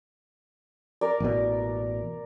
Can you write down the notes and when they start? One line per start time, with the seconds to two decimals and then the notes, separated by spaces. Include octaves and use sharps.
1.01 A#4 D5
1.20 A1 B2